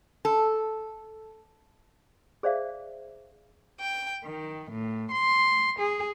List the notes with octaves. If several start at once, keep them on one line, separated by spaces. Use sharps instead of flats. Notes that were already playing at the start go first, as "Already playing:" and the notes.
A4
G#4 C5 D5 E5 F5
G5
D#3
A2
C6
G#4